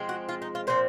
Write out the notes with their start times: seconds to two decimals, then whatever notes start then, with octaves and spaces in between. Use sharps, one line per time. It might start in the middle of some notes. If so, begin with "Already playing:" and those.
Already playing: F3 G#3 C4
0.09 F#4
0.29 F4
0.42 D#4
0.55 F4
0.67 A#2 F3 C4 C5